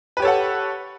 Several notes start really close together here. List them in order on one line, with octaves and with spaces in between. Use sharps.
B4 G4 C#5 A4 F#5